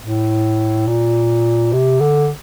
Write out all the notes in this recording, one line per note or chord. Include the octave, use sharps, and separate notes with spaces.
A2
A#2
C3
D3